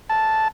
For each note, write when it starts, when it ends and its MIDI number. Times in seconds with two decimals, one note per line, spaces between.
0.09 0.48 81